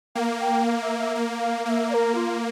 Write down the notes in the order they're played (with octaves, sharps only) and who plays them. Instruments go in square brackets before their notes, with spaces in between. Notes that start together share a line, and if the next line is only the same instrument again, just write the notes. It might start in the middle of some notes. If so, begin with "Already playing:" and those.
[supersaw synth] A#3 [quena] G5
[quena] F5
G5
F5
E5
E5
[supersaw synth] A#3
[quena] F5
[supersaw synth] A#3 [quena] E5 F5
[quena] D5
A#4
F4